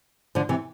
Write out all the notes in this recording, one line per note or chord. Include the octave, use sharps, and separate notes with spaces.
D3 F3
C3 E3